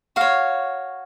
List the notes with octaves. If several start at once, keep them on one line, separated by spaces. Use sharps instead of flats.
F#4 C#5 F5